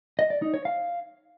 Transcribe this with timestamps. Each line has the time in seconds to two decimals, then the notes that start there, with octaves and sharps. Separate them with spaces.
0.19 D#5
0.30 D5
0.42 D#4
0.54 C#5
0.65 F5